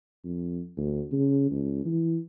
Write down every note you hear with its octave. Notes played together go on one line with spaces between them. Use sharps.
F2
D2
C#3
C#2
E3